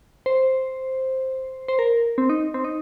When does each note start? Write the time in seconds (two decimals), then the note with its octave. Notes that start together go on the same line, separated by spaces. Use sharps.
0.26 C5
1.68 C5
1.79 A#4
2.18 C4
2.29 D#4
2.54 C4
2.64 D#4